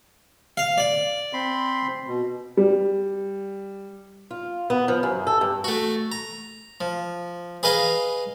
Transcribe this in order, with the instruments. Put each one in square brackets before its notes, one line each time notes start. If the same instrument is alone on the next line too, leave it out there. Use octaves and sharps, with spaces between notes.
[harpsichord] F5
D5
[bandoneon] C4 B5 C6
B2
[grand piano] G3
[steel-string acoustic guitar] F4
B3
F3
F#2
A4
G2
[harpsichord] A3 F#4
A#5
F3
G#4 B4 D#5 F5 G#5 A#5